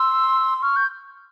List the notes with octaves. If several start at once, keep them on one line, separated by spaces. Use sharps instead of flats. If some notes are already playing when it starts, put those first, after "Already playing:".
Already playing: C6 E6
C#6 F6
G6